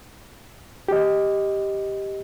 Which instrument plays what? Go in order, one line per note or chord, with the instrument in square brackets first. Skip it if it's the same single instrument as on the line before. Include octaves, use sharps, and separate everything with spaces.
[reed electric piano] G4 D#5